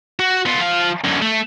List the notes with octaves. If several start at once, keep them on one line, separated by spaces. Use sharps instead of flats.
F#4
B3 F4
F3 F5
F#2 D3
A3